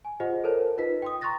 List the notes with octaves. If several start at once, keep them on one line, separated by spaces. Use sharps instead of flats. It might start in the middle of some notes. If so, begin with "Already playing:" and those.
G#5
F4 G4 G#4 C5 D#5 F#5
A4 A#4 C5 C#5 A5
D#4 F4 B4 D#5 B6
G5 C6 D#6
A#5 C6 C#6 F#6 A6 A#6